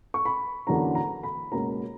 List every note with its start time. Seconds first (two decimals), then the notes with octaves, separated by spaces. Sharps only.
0.14 C#6
0.25 B5
0.67 E2 D3 F#3 A#3 C#4 A#5
0.95 A#5
1.23 B5
1.52 C#2 B2 A#3 C#4 A#5